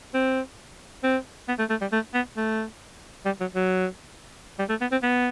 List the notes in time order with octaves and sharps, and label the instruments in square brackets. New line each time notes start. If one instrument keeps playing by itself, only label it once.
[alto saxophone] C4
C4
B3
A3
A3
G3
A3
B3
A3
G3
F#3
F#3
G3
A3
B3
C4
B3